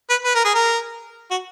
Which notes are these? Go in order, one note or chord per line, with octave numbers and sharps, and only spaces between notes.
B4
B4
A#4
G#4
A#4
F#4